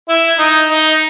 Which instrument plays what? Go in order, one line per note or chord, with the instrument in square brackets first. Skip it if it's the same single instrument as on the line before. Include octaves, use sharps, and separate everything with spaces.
[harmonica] E4
D#4
D#4